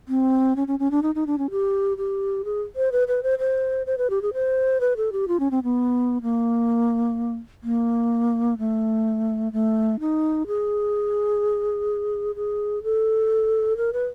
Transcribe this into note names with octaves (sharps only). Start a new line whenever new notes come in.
C4
C#4
C#4
C#4
D4
D#4
D#4
D4
C#4
G4
G4
G#4
C5
B4
B4
C5
C5
C5
B4
G4
G#4
C5
B4
A4
G4
F4
C#4
C4
B3
A#3
A#3
A3
A3
D#4
G#4
G#4
A4
A#4
B4